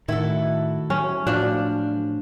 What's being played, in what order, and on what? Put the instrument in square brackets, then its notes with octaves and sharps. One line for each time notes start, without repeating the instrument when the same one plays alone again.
[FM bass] A2 [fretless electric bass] D#3 [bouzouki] E4 F#4 A4
[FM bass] F#3 [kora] C#4
[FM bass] A2 [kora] F3 D4 [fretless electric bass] F#3